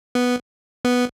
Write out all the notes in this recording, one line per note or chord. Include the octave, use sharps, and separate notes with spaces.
B3
B3